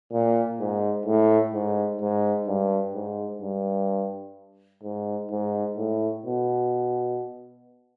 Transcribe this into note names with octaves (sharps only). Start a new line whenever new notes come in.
A#2
G#2
A2
G#2
G#2
G2
G#2
G2
G#2
G#2
A2
B2